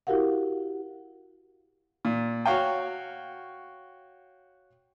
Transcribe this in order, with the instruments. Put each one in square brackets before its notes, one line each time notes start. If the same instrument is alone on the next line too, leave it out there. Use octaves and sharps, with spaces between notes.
[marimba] E4 F#4 G4 A#4 F5 F#5
[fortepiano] A#2
F#4 C#5 F5 G5